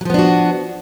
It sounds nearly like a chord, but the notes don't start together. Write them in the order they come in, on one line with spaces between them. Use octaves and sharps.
F#3 F3 B3 D4 F#4